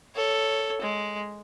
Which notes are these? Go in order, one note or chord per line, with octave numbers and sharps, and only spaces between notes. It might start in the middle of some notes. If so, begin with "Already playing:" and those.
A4 C#5
G#3